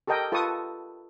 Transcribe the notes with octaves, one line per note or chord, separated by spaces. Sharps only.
G4 A4 A#4 D#5 G5
F4 A4 B4 A5 C#6 D#6